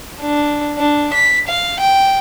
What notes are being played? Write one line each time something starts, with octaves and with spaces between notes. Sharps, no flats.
D4
D4
B6
F5
G5